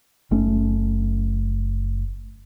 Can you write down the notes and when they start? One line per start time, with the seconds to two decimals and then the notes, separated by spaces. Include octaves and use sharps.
0.31 F#1 A3 C#4